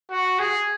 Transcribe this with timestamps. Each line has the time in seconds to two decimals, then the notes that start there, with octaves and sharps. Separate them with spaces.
0.10 F#4
0.39 G#4